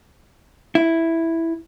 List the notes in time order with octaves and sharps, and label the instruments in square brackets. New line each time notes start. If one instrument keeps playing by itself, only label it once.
[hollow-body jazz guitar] E4